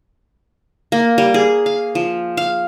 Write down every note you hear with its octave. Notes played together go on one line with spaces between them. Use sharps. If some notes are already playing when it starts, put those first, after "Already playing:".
A#3
G3
G#4
F5
F3
F5